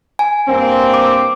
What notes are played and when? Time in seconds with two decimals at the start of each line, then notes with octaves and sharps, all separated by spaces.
0.19 G#5
0.48 G2 A#3 C4
0.94 D6